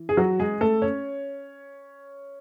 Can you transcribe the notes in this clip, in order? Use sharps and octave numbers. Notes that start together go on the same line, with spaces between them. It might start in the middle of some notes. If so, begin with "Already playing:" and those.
Already playing: E3
G#4
F#3 F#4
G#3 G#4
A3 A4
C#4 C#5